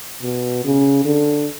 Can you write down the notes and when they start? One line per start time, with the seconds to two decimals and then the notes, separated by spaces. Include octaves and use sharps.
0.22 B2
0.64 C#3
1.05 D3